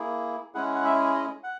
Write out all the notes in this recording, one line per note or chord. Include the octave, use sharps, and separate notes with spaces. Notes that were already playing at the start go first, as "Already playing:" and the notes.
Already playing: A#3 E4 G#4
G#3 C#4 E4 G#4 F#5
F#5
E5
D#5
F#5